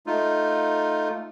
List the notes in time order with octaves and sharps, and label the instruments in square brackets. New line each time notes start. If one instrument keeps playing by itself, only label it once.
[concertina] A3 D#4 F4